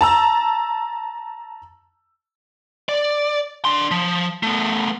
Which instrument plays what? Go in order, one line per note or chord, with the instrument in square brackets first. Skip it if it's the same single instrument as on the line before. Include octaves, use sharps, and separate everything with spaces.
[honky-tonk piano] A5 A#5 E6
[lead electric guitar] D5
D4 C6
F3
A3 B3